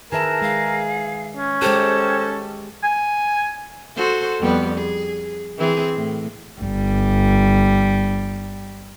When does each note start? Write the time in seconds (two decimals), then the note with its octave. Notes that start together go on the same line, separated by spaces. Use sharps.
0.12 D#3 G#4 A#4 B4 E5 A5
0.42 G#3 F5
1.37 C#4
1.62 G#3 G4 A4 C5
2.83 G#5
3.96 F#4 A4 C5
4.40 F2 G3 B3
4.78 G#4
5.58 E3 C4 G#4
5.95 A2
6.60 G1 G3